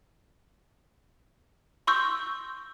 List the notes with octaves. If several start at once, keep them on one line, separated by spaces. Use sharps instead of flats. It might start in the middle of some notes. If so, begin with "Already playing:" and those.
C6 C#6 E6 G6